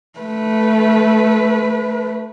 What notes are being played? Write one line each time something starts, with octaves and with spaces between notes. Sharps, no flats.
A3 B4